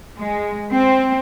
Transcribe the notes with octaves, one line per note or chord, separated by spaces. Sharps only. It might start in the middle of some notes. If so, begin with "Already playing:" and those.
G#3
C4